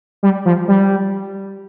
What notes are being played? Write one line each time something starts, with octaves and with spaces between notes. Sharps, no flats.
G3
F3
G3